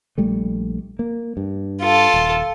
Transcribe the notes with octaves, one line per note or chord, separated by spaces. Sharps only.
A#1 G3 A3
A#3
G2
F4 A4
D#1